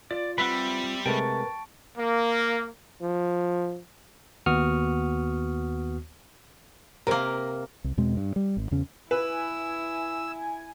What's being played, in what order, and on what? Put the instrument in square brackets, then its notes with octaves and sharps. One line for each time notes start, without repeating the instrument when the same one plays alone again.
[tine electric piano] F4 [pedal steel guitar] D5
[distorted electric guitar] G3 [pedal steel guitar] C4 E5 B5 [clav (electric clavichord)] B4 F#5
[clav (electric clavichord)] C3 G#3 A3 [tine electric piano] A#4 B4 [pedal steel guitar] G5 A5 C#6
[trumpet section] A#3
[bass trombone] F3
[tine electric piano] D#2 B3 F#4 C#6 D#6 F6
[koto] C3 A#3 [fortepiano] A#4
[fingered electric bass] C2
E2 B2 G#3 C4
G2
G3
G#1
E2 C#3 C#4
[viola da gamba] E4 [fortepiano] B4 [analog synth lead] G#5 [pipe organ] E6